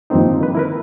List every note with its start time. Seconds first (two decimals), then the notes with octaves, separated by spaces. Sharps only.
0.10 G2 D#3 F3 A#3 C4 D#4
0.40 D#3 B4
0.55 E4 A#4 B4